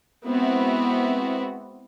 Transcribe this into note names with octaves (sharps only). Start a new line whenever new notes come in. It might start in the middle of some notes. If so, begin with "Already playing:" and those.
G#3 B3 C4 E4 F#4